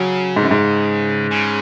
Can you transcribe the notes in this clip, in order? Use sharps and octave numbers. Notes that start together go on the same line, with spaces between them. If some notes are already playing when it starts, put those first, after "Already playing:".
Already playing: C#3 F#3
G#2
F#2
G#2
C#3